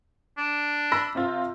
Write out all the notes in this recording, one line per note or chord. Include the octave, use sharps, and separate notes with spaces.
D4
B5 E6 A#6
C3 C4 F4